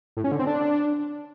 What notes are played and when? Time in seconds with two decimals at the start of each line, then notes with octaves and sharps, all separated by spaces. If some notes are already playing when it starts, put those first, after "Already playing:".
0.17 A2
0.24 C#4
0.32 D3
0.39 C4
0.47 D4